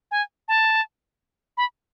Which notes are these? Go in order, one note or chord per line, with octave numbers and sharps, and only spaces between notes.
G#5
A5
B5